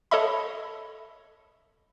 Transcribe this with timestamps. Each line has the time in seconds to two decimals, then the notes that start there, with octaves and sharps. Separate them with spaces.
0.11 A4 C#5 D#5 E5 B5